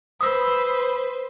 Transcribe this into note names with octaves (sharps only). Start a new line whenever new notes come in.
B4 C5 D#6 E6